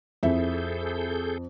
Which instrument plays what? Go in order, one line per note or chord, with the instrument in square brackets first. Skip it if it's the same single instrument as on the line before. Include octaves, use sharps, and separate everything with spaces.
[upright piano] F2 [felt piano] E4 E5 [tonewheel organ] G#4 A4 G6